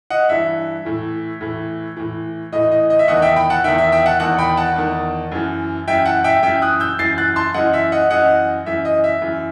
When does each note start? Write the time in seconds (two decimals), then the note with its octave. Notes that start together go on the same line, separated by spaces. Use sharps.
0.10 D#5 F#5
0.29 G2 E3 E5
0.85 A2 E3
1.41 A2 E3
1.97 A2 E3
2.52 A2 E3 D#5
2.71 D#5
2.90 D#5
2.99 E5
3.08 E2 D#3 D#5 F#5
3.22 E5 G5
3.36 G5 B5
3.50 F#5 A5
3.64 E2 D#3 E5 G5
3.78 E5
3.92 E5 G5
4.06 F#5 A5
4.20 E2 D#3 F#5 A5
4.38 G5 B5
4.57 F#5 A5
4.76 E2 D#3
5.32 F#2 E3
5.88 F#2 E3 E5 G5
6.06 F#5 A5
6.24 E5 G5
6.43 F#2 E3 E5 G5
6.62 D#6 F#6
6.80 E6 G6
6.99 F#2 E3 A6 C7
7.18 F#6 A6
7.36 A5 C6
7.54 F#2 E3 D#5 F#5
7.74 E5
7.92 D#5 F#5
8.11 F#2 E3 D#5 F#5
8.66 F#2 E3 E5
8.85 D#5
9.04 E5
9.22 F#2 E3